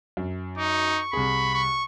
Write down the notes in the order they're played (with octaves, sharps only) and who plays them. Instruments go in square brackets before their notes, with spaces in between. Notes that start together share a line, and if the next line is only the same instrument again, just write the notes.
[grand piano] F#2
[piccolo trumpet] D#4 [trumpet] C#6
[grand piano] C2 G#4 [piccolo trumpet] B5
[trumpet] C#6